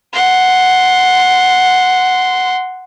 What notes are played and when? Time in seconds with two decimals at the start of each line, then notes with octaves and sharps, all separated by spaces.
0.13 F#5 C6